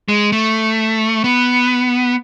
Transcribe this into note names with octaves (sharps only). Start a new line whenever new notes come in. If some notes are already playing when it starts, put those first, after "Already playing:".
G#3
A3
B3